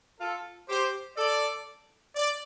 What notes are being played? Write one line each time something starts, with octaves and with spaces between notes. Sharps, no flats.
F4 A4
G4 C5
A4 D5
D5